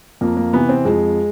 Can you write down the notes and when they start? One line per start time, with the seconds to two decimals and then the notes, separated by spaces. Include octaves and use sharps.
0.21 F2 A#3
0.37 A#3
0.53 C3 E3 B3
0.69 C4
0.85 F2 G#3